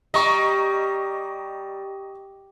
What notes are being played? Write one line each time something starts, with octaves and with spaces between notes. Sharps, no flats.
G3 D#5 A#5 C#6